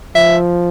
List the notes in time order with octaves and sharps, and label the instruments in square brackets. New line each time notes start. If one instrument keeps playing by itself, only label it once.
[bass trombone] F3 [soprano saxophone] E5